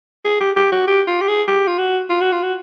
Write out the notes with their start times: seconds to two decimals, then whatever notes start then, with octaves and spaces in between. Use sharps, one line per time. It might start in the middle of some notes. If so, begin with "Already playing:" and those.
0.25 G#4
0.40 G4
0.56 G4
0.72 F#4
0.87 G4
1.07 F4
1.21 G4
1.28 G#4
1.48 G4
1.68 F4
1.78 F#4
2.10 F4
2.21 F#4
2.32 F4
2.43 F#4